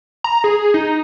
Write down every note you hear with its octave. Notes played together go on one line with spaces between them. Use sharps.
A#5
G#4
D#4